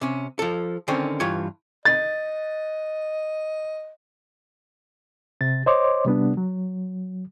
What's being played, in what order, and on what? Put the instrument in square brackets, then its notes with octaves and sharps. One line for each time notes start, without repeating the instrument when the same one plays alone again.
[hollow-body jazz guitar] C3 C#4
F3 A4
D3 D#3 C4 C#4
G2 E3 F4 C#5
[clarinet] D#5 [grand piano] A6
[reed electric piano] C3 A6
C5 C#5 D#5 C6 D6
C3 G3 B3 D4
F#3